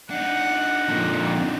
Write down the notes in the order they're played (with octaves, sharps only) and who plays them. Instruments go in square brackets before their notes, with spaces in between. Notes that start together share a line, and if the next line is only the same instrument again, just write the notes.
[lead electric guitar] D4 D#4 [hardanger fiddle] F#5
[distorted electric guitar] F2 A#2